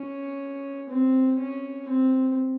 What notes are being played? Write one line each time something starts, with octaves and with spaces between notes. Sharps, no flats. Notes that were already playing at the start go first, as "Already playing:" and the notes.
Already playing: C#4
C4
C#4
C4